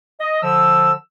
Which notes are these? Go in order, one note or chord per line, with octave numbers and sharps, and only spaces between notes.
D#5
D3 F3 E6